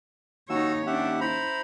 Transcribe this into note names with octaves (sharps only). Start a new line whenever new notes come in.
D#2 D#4 F#4 C#5 E6
C#4 D4 G4 E5 F#5
E4 C5 A#5 B5